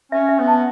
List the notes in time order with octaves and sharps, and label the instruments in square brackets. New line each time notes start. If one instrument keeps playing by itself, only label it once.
[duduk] C#4 [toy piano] E5
[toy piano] E5
[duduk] B3
[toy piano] A5